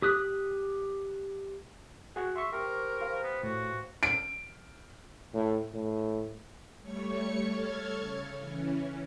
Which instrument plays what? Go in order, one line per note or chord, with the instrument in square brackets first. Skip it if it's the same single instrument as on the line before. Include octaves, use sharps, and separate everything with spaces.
[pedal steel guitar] G4 D#6 F#6
[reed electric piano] F#4 G#4 [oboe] F#5
[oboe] E5 [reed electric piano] C6 C#6
[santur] G4 C5 [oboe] A#4
[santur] B4 C5 F5
[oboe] B3
[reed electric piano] A2 [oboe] F#4
[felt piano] D7
[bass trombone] A2
A2
[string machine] G3 A3 C#5 C#6 C#7
A4 C#5 A5 F6 G#6
C#3
E3 C#4